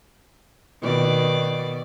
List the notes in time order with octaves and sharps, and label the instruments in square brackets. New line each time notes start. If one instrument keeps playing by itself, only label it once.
[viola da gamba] B2 D#3 D5